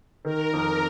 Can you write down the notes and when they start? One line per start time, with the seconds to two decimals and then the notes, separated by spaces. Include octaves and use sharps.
0.25 D#3 A#4
0.53 F2 A#4